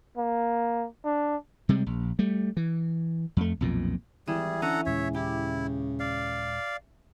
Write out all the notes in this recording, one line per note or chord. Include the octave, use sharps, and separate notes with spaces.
A#3
D4
C3 G3 G#3
A#1
G3 A3
E3
F2 A3
B1 F2 A#2
G#1 E3 G3 G#4
D3 C#4 A4 F#5 A#5
D#2 A#2 C#3 G#3 C#5 E5
E4 G4
D5 F5